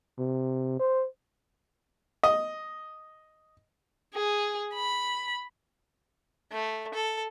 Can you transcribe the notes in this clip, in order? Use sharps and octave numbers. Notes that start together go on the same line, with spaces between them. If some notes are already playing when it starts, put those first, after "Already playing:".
C3
C5
D#5
G#4
B5
A3
A4